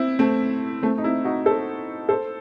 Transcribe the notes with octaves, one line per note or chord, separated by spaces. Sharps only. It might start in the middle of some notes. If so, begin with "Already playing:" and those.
Already playing: C4 E4
A3 C4
A3 C4
D#4
C4 E4
D#4 F#4
A4 C5
A4 C5